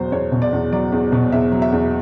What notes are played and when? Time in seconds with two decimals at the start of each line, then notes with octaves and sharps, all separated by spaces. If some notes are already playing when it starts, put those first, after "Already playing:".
Already playing: E2 B2 F#3 C5
0.12 E2 C#5
0.32 B2
0.42 D5
0.53 E2
0.72 F#3 D5
0.92 E2
1.12 B2
1.32 E2 E5
1.52 F#3
1.62 E5
1.72 E2